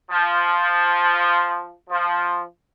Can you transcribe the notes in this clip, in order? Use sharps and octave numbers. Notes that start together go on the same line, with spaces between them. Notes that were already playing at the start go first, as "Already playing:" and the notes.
F3
F3